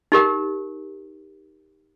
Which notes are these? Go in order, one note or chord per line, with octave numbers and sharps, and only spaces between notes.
D#4 G4 A#4